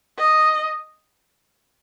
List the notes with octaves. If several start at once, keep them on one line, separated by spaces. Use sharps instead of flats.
D#5